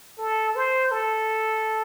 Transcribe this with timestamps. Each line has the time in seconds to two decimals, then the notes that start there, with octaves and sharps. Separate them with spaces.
0.18 A4
0.56 C5
0.91 A4